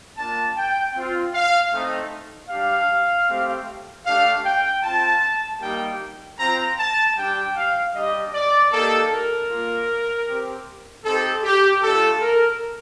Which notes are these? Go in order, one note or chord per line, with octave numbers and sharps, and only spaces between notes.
A#3 D4 F4 A5
G5
C4 F4
F5
A3 C4 D#4
G3 D4 G4 F5
A3 C4 G4
A3 D4 G4 F5
G5
C4 F4 A5
G3 A#3 D#4 G4 G5
C4 F4 A#5
A5
G3 D4 G4 G5
F5
G3 D4 G4 D#5
D5
A#3 D#4 G4 A4
A#4
A#3 F4
C4 G4
C4 D#4 G4 A4
G4
A3 D4 F4 A4
A#4